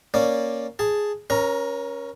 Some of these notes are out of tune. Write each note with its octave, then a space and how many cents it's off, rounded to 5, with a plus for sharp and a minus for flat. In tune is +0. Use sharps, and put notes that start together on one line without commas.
A#3 +0 C#4 +0 D5 +0
G#4 +0 A5 +0
C#4 +0 A#4 +30 A#5 +0